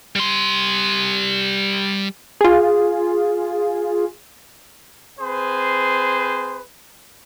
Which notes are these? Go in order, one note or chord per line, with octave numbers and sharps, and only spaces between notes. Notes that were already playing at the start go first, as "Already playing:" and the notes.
G3 C6
F4 G#4
C4 G#4 B4 C5